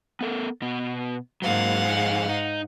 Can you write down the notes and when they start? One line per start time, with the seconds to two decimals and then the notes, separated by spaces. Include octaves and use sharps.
0.21 B3 A4 A#4
0.62 B2 B3
1.42 G#2 F#3 A#3 F5 F#5
1.85 F2 D#4 G#4
2.29 D#4